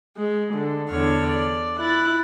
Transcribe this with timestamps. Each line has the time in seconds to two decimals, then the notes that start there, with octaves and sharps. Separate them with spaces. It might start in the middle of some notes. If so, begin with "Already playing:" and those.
0.17 G#3
0.53 D3
0.89 E2 D3 C#5 F6
1.27 D5
1.78 E4 F#6 A6